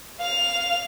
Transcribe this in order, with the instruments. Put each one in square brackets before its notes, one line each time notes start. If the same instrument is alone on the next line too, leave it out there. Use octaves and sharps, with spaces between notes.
[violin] F5 F7